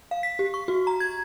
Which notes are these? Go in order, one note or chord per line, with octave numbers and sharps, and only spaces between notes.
F5
B6
G4
C#6
F#4
A#5
G#6